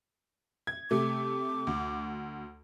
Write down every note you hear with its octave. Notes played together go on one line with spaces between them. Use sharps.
G#6
C3 A3 D6
D2